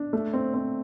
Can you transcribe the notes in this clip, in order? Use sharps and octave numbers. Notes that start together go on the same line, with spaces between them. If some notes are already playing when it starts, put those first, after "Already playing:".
Already playing: D4
A3
C4
C4